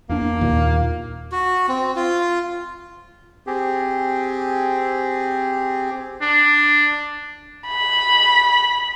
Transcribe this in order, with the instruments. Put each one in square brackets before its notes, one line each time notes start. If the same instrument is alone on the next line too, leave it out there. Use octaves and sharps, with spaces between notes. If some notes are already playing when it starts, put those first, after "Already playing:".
[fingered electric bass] E2 D4 [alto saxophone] A#3
[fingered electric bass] D#2 A#2
[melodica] F#4
C4
F4
[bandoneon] C4 G4 G#4
[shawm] D4
[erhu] B5